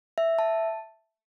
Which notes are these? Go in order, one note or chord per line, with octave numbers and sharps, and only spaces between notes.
E5
A5